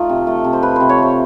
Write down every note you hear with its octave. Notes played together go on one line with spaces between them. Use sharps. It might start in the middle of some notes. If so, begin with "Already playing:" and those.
Already playing: A3 D#4 F4
C3
A3
C3
C5
F3 B4
C3 C5
C#5
A3 C5